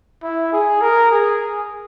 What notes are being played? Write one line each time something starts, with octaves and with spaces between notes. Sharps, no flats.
E4
G#4
A#4
G#4